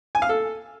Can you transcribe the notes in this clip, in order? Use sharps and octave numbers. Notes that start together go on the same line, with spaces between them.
G#5
F5
A4